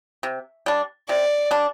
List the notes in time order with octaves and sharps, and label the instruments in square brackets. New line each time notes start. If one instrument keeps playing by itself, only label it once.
[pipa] C3
G3 D4
[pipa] C3 [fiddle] D5
[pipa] G3 D4